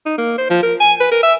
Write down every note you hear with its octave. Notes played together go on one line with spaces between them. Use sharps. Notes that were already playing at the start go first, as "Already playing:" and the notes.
D#4
A#3
C5
F3
A#4
G#5
B4
A#4
E5